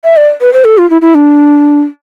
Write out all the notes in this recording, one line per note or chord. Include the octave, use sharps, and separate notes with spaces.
E5
D5
B4
C5
A4
F4
E4
E4
D4